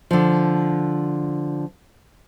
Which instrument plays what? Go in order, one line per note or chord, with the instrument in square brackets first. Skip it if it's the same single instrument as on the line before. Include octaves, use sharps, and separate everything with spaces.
[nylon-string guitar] D3 F3